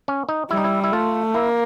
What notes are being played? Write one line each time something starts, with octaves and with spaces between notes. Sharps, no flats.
C#4
D#4
G3 E4
D#4
E4
E4
A3 F4
A#3 E4